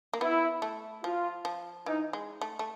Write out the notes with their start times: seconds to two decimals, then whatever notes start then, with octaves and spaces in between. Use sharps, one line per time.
0.14 A#3
0.21 B3 E4
0.62 A3
1.04 F3 F4
1.45 F3
1.86 E3 D#4
2.13 G#3
2.41 A3
2.59 A3